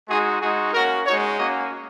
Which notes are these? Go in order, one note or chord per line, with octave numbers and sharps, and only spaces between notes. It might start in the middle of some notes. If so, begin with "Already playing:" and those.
G#3 D#4 F#4 G#4
G#3 D#4 F#4 G#4
A#3 C#4 F#4 A#4
G#3 D#4 F#4 C#5
A#3 C#4 F#4 D#5